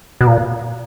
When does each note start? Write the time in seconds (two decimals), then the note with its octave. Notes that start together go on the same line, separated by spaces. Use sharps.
0.21 B2
0.27 A#2